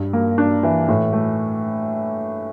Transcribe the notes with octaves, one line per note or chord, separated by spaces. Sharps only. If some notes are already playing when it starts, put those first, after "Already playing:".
Already playing: G2
A#3
D4
E3
A2
A3